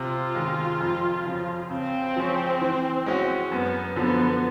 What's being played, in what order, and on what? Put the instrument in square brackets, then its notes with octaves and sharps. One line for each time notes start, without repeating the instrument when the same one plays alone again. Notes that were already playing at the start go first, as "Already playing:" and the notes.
Already playing: [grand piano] C3 [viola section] F4
[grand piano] D#3 G#3
F2
C#3 F3
[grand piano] C#3 [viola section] C4
[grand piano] F3 G#3 C#4
E3
G#3 C#4 F#4
[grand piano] F#2 [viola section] B3
[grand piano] D3 F3 [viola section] B3